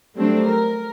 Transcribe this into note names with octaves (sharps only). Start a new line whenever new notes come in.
F#3 G3 A3 C4 D4
A#4